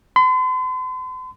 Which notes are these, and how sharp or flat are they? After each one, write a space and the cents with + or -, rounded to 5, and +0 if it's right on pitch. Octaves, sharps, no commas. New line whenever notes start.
C6 -45